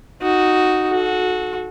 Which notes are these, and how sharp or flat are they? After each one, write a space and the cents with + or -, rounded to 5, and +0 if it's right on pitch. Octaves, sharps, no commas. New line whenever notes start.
D#4 +0 F#4 +0
F#4 -15 A4 -30